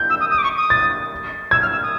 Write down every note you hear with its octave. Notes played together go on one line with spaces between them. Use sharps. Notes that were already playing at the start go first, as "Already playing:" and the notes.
Already playing: G6
E6
D#6
D#6
D6
C#6
D#6
A6
E6 G#6
F6
E6
D#6